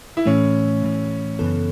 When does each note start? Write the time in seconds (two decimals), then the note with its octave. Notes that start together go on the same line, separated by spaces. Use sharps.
0.17 E4
0.26 A2 E3 A3 C#4
0.83 A2 E3 A3
1.39 F#2 C#3 E3 B3 A4